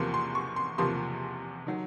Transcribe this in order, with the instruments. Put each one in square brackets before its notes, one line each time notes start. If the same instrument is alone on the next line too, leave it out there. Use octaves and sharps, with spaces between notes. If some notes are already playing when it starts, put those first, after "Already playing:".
Already playing: [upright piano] E2 C3 F3 A#3 C6
C6
C#6
C6
E2 C3 F3 A#3 C6
D#3 F#3